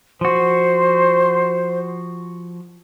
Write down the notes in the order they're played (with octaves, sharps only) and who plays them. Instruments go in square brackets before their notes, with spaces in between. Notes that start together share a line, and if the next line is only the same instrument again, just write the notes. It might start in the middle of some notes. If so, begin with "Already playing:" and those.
[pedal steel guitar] F3 F#4 [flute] C5